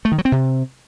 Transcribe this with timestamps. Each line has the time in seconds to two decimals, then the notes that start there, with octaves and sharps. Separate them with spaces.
0.05 A3
0.12 D#3
0.18 F#3
0.25 C4
0.32 C3